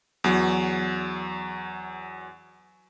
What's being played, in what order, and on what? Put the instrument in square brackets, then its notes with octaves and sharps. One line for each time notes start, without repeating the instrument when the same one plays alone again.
[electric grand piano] E2 F#3